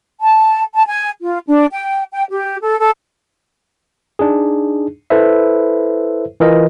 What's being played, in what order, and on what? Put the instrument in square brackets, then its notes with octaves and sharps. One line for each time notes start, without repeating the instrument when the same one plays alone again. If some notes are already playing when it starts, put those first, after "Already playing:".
[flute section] A5
A5
G#5
F4
D4
G5
G5
G4
A4
A4
[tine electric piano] D4 D#4 G#4
E4 A4 B4 C5 E5
E3 F4 A#4 D#5